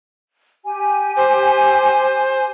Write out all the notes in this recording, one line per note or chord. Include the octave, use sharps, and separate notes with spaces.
G4 G#5
C5